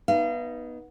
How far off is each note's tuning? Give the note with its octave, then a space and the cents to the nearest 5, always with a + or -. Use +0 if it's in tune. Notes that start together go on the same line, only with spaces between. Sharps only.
B3 -15 D#4 +0 F5 -40